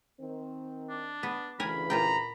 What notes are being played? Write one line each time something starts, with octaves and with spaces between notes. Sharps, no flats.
D#3 C4
D4
B3
D2 C#3 E3 A#4 G#5 B5
A#2 F4 G5 A#5